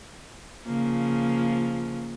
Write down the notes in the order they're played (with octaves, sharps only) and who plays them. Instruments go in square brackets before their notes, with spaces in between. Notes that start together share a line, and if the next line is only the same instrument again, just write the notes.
[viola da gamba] C#3 F3 A#3